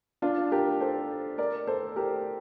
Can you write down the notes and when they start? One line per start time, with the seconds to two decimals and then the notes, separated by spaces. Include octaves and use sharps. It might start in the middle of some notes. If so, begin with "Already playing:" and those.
0.22 D4 F4
0.52 G4 A#4
0.81 A4 C5
1.38 A#4 D5
1.67 A4 C5
1.96 G4 A#4